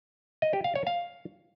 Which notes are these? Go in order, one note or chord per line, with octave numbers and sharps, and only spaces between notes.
D#5
G4
F5
C#5
F5